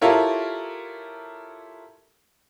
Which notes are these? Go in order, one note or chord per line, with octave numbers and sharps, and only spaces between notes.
E4 F4 G4 A4 A#4 C#5